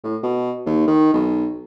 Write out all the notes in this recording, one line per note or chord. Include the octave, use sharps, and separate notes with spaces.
A2
B2
D#2
D#3
B1